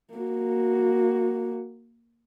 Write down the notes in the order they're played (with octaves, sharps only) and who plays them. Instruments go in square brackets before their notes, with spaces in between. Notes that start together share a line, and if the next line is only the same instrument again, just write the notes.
[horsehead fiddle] A#3 F#4